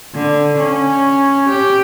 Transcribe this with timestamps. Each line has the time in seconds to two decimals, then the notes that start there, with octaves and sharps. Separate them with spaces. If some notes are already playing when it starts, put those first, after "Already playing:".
0.15 D3
0.59 C#4
1.49 G4